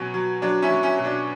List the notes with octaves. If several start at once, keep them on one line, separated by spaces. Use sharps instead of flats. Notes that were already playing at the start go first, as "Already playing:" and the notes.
Already playing: B2 F#3 C#4
F#3
F#3 D4
C#4 E4
F#3
C#4 E4
B2
D4